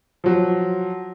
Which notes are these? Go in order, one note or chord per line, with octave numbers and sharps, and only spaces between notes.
F3 F#3